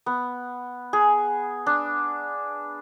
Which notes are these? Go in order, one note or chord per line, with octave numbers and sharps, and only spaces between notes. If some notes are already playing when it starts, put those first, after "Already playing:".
B3
G#4
D4